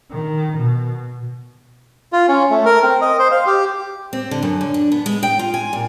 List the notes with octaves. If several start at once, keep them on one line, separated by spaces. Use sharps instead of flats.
D#3
B2
F4
C#4
A3
A#4
C4
D#5
C5
F5
G4
C4
D3
F#2
D3
D4
B3
G#3
G5
F4
G#5
A#2